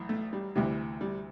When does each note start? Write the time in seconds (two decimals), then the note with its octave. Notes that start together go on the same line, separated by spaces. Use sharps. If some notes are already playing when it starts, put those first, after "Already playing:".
Already playing: B1 A2 E3
0.09 A3
0.33 G3
0.55 D2 C3 E3 G3
1.01 G3